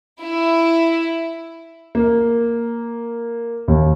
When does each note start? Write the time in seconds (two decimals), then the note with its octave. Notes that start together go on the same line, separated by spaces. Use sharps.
0.22 E4
1.95 A#3
3.68 D#2